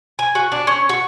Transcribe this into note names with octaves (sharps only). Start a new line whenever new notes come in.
G#5
F#4
D4
C#4
F#4